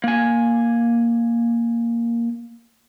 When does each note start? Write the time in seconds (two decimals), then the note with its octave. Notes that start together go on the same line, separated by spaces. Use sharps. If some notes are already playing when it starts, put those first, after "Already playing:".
0.04 A#3 G#5